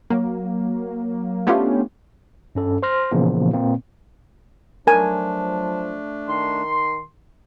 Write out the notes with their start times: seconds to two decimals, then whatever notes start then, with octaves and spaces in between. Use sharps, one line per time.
0.10 F#3 A#3
1.47 A3 B3 C#4 D4 F4 G4
2.55 G2 C#4 A4
2.83 C5 C6 F6 A#6
3.11 A#2 C#3 E3 F3 A#3 B3
3.53 A#2 A#3 C4
4.87 F3 F#3 A3 D4 A#4 G#5
6.28 D#3 C6